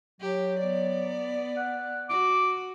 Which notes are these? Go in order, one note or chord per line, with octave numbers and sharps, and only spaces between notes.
F#3 G4
B3 D5
F#5
F#4 D6